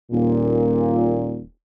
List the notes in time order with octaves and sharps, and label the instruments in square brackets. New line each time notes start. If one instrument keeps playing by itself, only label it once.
[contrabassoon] D#1 [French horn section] A#2